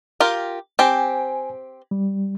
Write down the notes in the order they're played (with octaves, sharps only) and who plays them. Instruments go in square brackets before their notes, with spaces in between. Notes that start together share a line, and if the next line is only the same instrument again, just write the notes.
[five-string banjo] F4 G4 A#4
[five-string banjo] C4 G4 [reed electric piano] G#5
[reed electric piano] G3